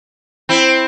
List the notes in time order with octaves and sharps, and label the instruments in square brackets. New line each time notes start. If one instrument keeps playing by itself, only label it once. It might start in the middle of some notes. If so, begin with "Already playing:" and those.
[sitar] C4 E4